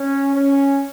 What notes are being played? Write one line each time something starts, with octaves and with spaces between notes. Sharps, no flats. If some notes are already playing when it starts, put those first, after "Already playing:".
Already playing: C#4
C#4